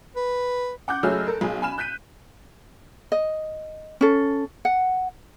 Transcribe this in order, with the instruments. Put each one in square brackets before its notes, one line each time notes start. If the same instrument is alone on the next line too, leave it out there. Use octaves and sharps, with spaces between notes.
[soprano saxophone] B4
[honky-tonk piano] F#5 D6 F#6 G6
F#1 F#3 A3 G#4 E6 F6
A4 A#4
B1 G#4
G#5 B5 F6 E7
F#6 G6 B6 D#7
[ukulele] D#5
C#4 A4
F#5